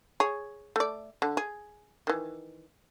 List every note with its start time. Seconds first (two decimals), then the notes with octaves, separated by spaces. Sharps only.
0.20 G#4 C#5
0.76 A3 D5
1.22 D3
1.37 G#4
2.07 D#3 E3